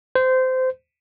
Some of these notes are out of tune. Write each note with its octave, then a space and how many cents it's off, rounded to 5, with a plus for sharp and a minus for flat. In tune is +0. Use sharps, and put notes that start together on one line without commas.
C5 -20